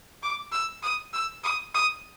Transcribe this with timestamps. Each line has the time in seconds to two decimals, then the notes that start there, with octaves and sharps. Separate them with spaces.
0.23 D6
0.52 E6
0.83 D#6
1.13 E6
1.44 D#6
1.74 D#6